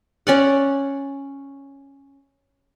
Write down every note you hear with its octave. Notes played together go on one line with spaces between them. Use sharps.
C#4 D5 F#5